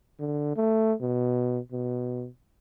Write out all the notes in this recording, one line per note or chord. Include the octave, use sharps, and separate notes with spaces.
D3
A3
B2
B2